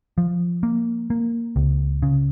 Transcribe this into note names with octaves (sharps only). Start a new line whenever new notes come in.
F3
A#3
A#3
C#2
C#3